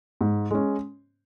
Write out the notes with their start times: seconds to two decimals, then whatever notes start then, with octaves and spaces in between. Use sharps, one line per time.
0.21 G#2
0.51 G#3 C#4